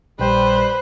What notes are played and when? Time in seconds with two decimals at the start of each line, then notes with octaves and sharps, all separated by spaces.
0.20 A#1 G3 B4 C5 G5